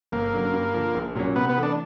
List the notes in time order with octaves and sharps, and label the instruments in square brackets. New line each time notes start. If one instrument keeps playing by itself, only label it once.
[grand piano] G1 [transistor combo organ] A#3
[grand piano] F#2 D3 F#3
G2
D3 F3
A#1
A#2 F#3 A#3 C#4
[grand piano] C3 [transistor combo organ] B3
[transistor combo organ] B3
[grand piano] E3 A3
[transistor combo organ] D4